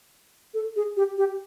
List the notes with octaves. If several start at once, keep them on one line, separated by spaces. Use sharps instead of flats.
A4
G#4
G4
G4